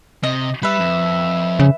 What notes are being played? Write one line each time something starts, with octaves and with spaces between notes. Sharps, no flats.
C3 D#5
G3 B4 E5
F2
C#3